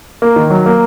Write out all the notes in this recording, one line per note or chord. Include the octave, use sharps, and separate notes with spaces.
A#3
D#3
F#3
A#3